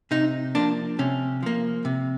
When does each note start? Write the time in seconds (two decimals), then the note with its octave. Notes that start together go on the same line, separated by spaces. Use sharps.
0.11 C3 D#4
0.55 F3 A#3 D4
0.99 C3 C#4
1.43 F3 A#3
1.85 C3